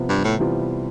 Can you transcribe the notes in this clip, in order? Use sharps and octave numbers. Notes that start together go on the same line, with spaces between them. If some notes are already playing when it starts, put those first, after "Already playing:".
Already playing: C3 F3 B3
G2
A2
C3 E3 G3 B3 F4